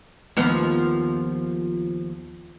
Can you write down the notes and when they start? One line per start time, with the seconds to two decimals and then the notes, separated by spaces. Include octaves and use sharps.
0.37 D#2 F3 B3